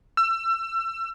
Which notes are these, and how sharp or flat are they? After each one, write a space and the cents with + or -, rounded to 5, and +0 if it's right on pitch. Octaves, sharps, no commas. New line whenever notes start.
E6 +30